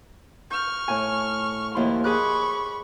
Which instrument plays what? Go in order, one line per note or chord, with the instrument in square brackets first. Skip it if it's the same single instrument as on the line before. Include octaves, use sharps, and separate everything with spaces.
[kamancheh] C#6 F6 [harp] G6
[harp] A2 G#5
[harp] D#2 F3 C6 [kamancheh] E4
[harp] G#4 D6 F#6 [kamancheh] B5 C#6